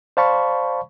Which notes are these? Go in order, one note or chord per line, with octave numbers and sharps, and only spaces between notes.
C5 D5 F5 A5 B5 C#6